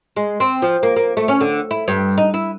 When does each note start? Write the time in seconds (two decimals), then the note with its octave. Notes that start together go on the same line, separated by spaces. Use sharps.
0.16 G#3
0.40 C4
0.62 F3
0.83 A#3
0.96 A#3
1.17 A3
1.28 C#4
1.41 D3
1.71 E4
1.88 G2
2.18 D#4
2.34 E4